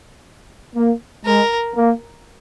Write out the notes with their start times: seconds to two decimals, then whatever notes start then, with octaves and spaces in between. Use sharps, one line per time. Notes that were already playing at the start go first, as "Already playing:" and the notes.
0.76 A#3
1.25 G#3 A#4
1.75 A#3